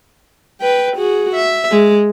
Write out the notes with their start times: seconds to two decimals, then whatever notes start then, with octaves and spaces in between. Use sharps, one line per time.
0.61 B4 G5
0.97 F#4 G#4
1.35 E5
1.71 G#3